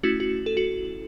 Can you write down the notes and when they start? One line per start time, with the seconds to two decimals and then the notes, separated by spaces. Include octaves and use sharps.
0.03 A3 C#4 E4 F#4
0.20 F#4
0.46 A4
0.57 F#4